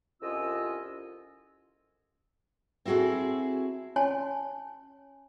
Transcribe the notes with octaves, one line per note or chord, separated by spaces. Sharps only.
C2 F2 C#4 F4 D#5 E6
C4 E4 F#4 G#4 A4
C#4 C#5 G#5 A5 C6